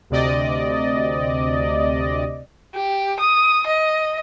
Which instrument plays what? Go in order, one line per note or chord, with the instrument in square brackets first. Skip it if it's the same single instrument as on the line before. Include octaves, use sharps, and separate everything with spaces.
[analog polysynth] D2 C3 D5 D#5
[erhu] G4
D#6
D#5